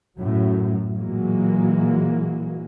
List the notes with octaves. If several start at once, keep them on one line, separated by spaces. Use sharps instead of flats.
F#2 A2 F#3
A#2 E3 F#3 G#3 A#3